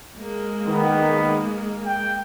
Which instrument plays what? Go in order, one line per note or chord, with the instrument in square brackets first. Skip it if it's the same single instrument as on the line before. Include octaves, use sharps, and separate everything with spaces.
[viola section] G#3 A#3
[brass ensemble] D#3 B3
G5